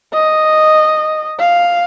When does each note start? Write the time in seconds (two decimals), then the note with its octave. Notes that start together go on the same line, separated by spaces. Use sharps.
0.14 D#5
1.40 F5